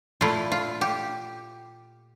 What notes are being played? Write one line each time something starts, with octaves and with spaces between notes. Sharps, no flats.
A#2 A3 E4 F4
F4
G4